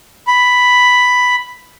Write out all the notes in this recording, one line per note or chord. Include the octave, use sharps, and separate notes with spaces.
B5